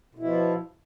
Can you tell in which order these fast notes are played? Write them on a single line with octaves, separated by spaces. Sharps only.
B2 E4 F3